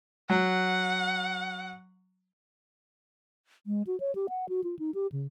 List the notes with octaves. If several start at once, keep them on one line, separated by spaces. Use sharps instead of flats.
F#3 F#5
G#3
F#4
C#5
G4
F#5
F#4
F4
D#4
G4
C#3